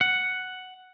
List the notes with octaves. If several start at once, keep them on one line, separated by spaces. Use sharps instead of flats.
F#5